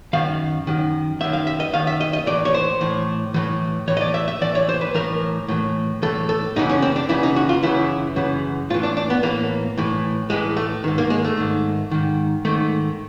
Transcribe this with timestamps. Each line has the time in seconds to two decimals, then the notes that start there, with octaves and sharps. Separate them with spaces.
0.13 F#2 D#3 F5
0.67 F#2 D#3
1.20 F#2 E5
1.24 D#3
1.33 F5
1.47 E5
1.60 D#5
1.73 F#2 D#3 F5
1.87 E5
2.01 D#5
2.13 D#5
2.27 A2 E3 D5
2.45 C#5
2.54 C5
2.81 A2 E3
3.34 A2 E3
3.87 A2 E3 C#5
3.97 D#5
4.01 D5
4.14 E5
4.28 E5
4.41 A2 E3 D5
4.55 C#5
4.69 C5
4.81 B4
4.95 A2 E3 A#4
5.48 A2 E3
6.02 A2 E3 A4
6.29 A4
6.56 F#2 C#3 E3 D#4
6.70 C#4
6.82 C4
6.96 D4
7.09 F#2 C#3 E3 E4
7.23 D#4
7.36 F#4
7.49 F4
7.63 F#2 C#3 E3 E4
8.16 F#2 C#3 E3
8.70 A2 F4
8.74 E3
8.83 D4
8.97 D4
9.10 B3
9.23 A2 E3 A#3
9.77 A2 E3
10.30 A2 E3 G#3
10.57 A3
10.84 G#2 D#3
10.98 A#3
11.10 G#3
11.24 A3
11.37 G#2 D#3
11.91 G#2 D#3
12.45 G#2 D#3 A3